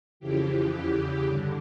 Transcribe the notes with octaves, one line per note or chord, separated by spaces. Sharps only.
F2 C#3 E3 G4
E2 C#3 E3 G4
G2 D3